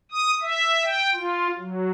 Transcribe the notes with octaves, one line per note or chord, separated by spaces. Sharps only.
D#6
E5
G5
F4
F#3